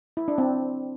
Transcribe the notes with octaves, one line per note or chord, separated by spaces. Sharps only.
E4
D4
C4